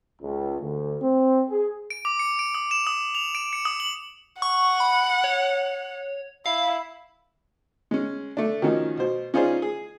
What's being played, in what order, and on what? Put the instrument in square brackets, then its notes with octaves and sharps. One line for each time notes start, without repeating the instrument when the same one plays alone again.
[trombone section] C#2
D2
C4
G#4
[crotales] D7
D6
C#7
D7
D#6
E7
D#6
F7
D7
C#7
D#6
F#7
[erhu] F#5 [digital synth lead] C#6
[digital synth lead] B5
C#5
[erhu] E4 [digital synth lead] F5
[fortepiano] G#3 C#4
A3 D4
D#3 F3 C#4 D#4 F#4
B2 C5
C#4 D#4 F4 G#4 C5 D5
G#4